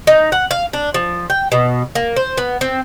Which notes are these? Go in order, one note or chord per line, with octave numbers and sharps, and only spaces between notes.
D#4
F#5
F5
D4
F3
G5
B2
A#3
C5
B3
C4